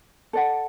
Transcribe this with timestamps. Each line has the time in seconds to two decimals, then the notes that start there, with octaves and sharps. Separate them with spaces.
0.33 A4 D5 F#5